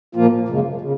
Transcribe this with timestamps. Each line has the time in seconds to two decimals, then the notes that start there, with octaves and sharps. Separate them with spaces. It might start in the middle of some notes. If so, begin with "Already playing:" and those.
0.15 A#2 F3 A#3 F4
0.48 F#2 C#3 G#3
0.81 C#3